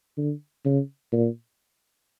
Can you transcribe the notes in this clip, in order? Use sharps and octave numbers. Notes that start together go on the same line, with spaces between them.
D3
C#3
A#2